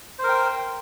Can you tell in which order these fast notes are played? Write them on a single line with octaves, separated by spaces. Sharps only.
C5 A#4 G5